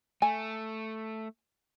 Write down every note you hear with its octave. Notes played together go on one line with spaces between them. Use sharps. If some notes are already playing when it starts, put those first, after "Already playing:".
A3 G#5